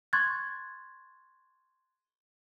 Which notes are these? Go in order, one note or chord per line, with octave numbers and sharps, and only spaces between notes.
C6 C#6 F#6 G#6 A6